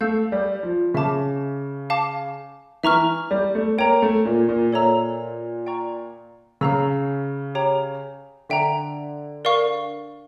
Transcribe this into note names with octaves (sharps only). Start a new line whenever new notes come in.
A3 F5 A5 E6 G6
G3
F3
C#3 E5 A5 D6
F5 A5 D6
E3 E5 A#5 C#6 F6
G3
A3
A#3 C#5 G5 A#5
A3
A#2
A#2
A#2 A4 C#5 E5 A#5 E6
D5 G5 A#5 C#6
C#3 C#5 F5 A#5 E6
G4 C#5 G5 A#5
D3 E5 G5 A#5
A#4 D5 F5 C#6